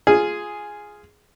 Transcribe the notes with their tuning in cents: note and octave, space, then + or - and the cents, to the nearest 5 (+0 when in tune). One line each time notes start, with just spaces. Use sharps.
F4 -5 G#4 +0